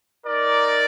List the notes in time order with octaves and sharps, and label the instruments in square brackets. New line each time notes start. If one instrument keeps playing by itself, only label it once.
[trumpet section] D#4 A#4 D5